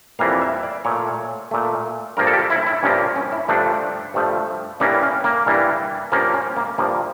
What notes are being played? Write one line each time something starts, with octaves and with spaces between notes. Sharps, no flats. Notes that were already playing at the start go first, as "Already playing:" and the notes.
F2 E3 G3 A#3 F5
E5
D5
A#2 A3 C#5
A#2 A3
G2 F3 A#3 A#4
A4
G4
E4
E4
G2 F3 A#3 C#4
C#4
E4
G2 F3 A3 D4
G2 F3 A3
G2 E3 G3 A#3 C#4
C#4
A#3
G2 E3 G3 A#3
G2 F3 A#3 C#4
C#4
A#3
G2 F3 A#3